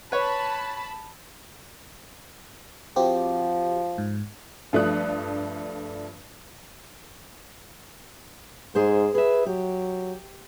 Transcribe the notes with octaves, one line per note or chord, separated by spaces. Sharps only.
B4 C#5 A5 B5
F3 C4 F#4 G4
G#2
G2 F3 A3 D4 D#6 F#6
G#2 G#4 C5
G#4 B4 E5
F#3 G4